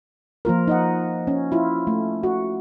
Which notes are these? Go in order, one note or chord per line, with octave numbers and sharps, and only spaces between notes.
F3 A#3 F4 A#4
D#4 D#5 F#5
C#4
E4 F4
A3
F#4